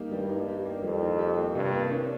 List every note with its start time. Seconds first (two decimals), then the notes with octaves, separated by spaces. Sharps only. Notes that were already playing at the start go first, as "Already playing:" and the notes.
Already playing: G3 A#3 D#4 G4
0.11 G2 G3
0.29 D#4
0.47 G4
0.65 A#3
0.83 F2 G3
1.01 D#4
1.19 G4
1.37 A#3
1.55 G2 C3
1.73 A#3
1.91 C#4